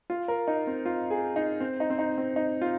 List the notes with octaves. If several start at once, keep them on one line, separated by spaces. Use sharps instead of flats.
F4
A#4
D#4
C4
F4
G#4
D#4
C4
D#4
C4
D#4
C4
D#4
F4